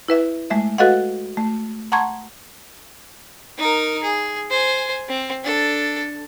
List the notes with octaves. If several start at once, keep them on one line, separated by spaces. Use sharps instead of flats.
E4 B4 E5
G#3 A3 E5
F#4 A4 B4 D#5 F5 F#5
A3
F#5 A5 A#5 C6 C#6 G#6
D#4 A#4
G#4
C5 G#5
C4
D4 A4